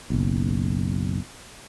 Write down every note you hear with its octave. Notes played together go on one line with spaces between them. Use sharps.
F#1 B1